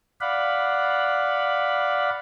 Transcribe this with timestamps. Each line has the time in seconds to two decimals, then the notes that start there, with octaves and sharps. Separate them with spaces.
0.21 D5 F5 F#5 B5